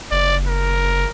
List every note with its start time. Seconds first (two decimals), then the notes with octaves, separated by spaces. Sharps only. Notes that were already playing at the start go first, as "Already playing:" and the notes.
0.12 F#1 D5
0.47 A#4